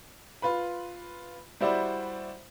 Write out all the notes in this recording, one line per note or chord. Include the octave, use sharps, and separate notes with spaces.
F4 B4 B5
G3 E4 F#4 C5 D5 E5